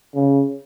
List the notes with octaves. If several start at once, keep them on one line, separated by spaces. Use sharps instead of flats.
C#3